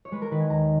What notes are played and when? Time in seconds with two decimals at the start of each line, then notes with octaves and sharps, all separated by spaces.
0.05 C#5
0.12 G#3 B4
0.22 A#4
0.31 D#3 B4
0.40 G#5
0.50 D#2 A#5